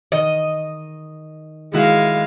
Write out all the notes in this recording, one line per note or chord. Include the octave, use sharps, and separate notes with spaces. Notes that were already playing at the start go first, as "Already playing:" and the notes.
D#3 D#5
D#3 G#3 E4 F#4 F5